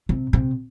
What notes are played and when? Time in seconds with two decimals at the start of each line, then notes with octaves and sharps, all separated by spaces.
0.09 C3
0.33 C3